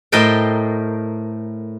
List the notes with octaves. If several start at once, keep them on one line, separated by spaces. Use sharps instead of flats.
A2 A#4 C5 D#5 G5 A5